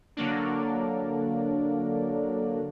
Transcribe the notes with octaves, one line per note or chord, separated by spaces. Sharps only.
D3 F#3 A#3 D4